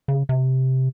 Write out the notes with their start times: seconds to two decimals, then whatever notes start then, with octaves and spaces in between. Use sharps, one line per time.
0.08 C#3
0.29 C3